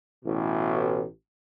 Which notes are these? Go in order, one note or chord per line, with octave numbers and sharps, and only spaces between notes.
A1 B2